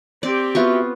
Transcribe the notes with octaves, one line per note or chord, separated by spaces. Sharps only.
C4 G4 D5
B3 F4 F#4 E5 C#6